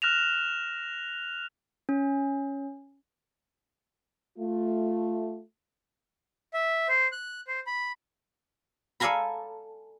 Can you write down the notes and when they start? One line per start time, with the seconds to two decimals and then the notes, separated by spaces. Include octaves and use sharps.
0.02 F6 F#6 A#6 E7 F7
1.89 C#4
4.38 A3 F4
6.54 E5
6.88 C5
7.12 F#6
7.47 C5
7.67 B5
9.00 A4 D5 F5 G#5 A#5 B5